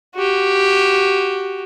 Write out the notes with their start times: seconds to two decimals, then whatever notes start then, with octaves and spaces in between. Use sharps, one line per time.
0.16 F#4 G4